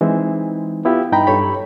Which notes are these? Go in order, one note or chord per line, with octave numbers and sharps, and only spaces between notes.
E3 G#3 C4 D#4 E4
B3 E4 F4 G4
G2 D#4 G5 A#5 B5
G2 G3 A4 C#5 B5